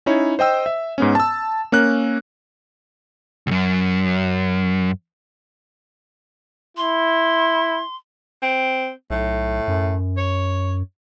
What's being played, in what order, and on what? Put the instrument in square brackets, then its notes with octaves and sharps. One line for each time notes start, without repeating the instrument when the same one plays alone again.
[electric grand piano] C#4 D#4 E4 C#5
C5 D#5 G5 E6
E5
G#2 B3 C#4
A5 E6
A#3 C#4 A#4 F#6
[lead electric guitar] C#2 F#2
[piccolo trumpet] E4 [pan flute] C6
[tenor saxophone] C4
[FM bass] B1 [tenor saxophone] A2
[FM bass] F#2
[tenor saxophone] C#5